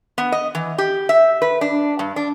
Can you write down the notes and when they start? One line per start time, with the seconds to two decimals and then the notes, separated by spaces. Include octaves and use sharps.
0.18 B3
0.32 D#5
0.55 E3
0.78 G4
1.09 E5
1.42 B4
1.61 D4
1.99 G2
2.16 D4